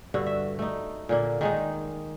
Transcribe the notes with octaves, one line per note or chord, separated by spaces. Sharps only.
G2 D3 F#4
E5
A3 D#4
A#2 D3 A#3
D#3 G#3 D#4